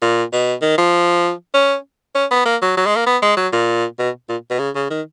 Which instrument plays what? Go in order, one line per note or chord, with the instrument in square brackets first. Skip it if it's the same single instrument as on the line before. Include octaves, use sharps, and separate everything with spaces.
[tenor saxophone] A#2
B2
D#3
F3
C#4
C#4
B3
A#3
F#3
F#3
G#3
A#3
B3
G#3
F#3
A#2
B2
A#2
B2
C#3
C#3
D#3